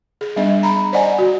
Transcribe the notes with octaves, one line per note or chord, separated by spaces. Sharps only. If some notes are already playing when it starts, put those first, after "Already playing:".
G#4
G3 B3 D4 D#5
A#5 B5
C5 D5 D#5 F#5 G#5
F#4